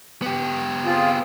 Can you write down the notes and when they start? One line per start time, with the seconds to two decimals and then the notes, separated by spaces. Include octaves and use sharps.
0.22 B3 G4
0.85 C4 F4 G#4